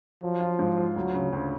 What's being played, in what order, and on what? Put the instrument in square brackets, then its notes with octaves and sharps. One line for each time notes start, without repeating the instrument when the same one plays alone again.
[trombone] F3 [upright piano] F#3
[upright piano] F4
G#2
F4
[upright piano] D2 [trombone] F#3
[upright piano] C#3
D2